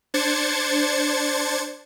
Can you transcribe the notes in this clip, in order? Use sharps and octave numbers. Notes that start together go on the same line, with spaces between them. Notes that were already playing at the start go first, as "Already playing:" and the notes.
D4 C5 G#6 A6 C#7